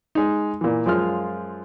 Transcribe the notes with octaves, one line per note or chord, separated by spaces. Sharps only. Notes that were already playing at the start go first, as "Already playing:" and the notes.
G#3 D#4
A#2 E3
F#2 F3 G#3 F4 F6